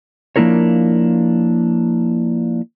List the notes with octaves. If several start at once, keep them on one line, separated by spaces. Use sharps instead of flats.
F3 A#3 D4 E4 A#4 C#5